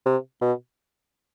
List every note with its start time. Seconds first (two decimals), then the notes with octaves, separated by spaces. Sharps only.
0.06 C3
0.42 B2